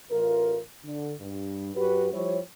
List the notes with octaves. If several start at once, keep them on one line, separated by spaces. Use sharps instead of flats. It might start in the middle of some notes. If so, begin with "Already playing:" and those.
A1 F4 A#4
D3
G2
F#2 F#4 G4 B4
F3 G3 E4 G4 C5 C#5